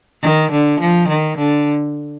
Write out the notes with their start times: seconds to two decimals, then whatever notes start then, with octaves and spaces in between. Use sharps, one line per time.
0.23 D#3
0.51 D3
0.80 F3
1.08 D#3
1.38 D3